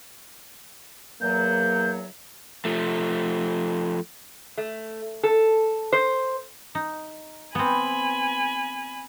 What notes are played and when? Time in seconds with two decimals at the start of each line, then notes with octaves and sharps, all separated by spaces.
1.21 E2 F#3 A#3 G6
2.65 F3 A3
4.58 A3
5.23 A4
5.93 C5
6.75 D#4
7.55 B3 C4 G#5 B5